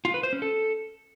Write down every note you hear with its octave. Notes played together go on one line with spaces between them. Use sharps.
F4
B4
C5
C#4
A4